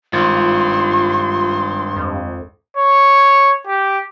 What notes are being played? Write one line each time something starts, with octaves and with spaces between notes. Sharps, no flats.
G#1 G2 F4 C6
F2
C#5
G4